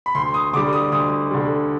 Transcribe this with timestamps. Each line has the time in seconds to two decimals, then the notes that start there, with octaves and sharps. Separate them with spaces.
0.06 B5
0.15 D2 C6
0.34 D#6
0.53 D3 G3 D6
0.73 D#6
0.92 D2 D#6
1.31 D3 G3